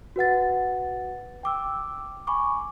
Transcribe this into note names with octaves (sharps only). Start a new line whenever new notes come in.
F#4 B4 F#5 A6
G5 D6 E6
G#5 B5 C#6 D6